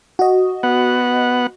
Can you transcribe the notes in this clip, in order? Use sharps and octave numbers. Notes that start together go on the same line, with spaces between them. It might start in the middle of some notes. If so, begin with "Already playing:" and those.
F#4 D#5
B3 F#5